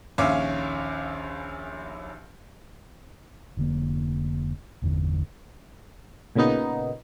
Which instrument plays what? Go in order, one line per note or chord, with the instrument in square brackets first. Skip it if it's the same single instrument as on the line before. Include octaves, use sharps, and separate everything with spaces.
[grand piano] A#1 D#2 C#4 E5 F5 D6
[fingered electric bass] F1 D3 A#3
G1 E2 D3
[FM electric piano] A#2 C#3 A#3 B3 D#4